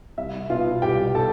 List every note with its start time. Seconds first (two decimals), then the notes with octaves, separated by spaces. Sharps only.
0.18 C2 E5
0.50 B2 B3 F4 F5
0.82 C2 G4 G5
1.15 B2 A4 A5